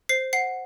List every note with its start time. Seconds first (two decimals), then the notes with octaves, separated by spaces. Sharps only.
0.09 C5 C7
0.33 F#5 C7